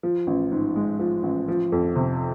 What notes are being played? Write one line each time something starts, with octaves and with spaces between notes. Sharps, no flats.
F3
A1
G#2
G#3
F3
A1
F3
F2
C3